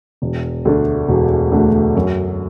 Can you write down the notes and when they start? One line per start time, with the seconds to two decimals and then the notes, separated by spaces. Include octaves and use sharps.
0.22 E1
0.65 D2 D3 A3 D4
1.08 E1
1.52 D2 D3 A3 D4
1.95 F#2